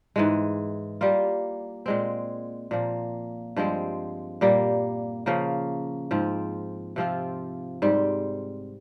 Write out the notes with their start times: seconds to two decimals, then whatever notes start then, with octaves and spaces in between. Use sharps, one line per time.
0.16 G#2 E3 G#3
1.01 G3 A#3 F4
1.86 A#2 G#3 C4
2.71 A#2 F3 A#3
3.56 G2 F3 G#3 C4
4.41 A#2 G3 A#3
5.26 C#3 F3 A#3
6.11 G#2 F3 C4
6.96 C3 F3 C4 F4
7.82 G#2 G3 C4